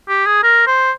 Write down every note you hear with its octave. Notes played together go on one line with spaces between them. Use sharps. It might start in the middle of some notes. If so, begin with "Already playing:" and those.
G4
G#4
A#4
C5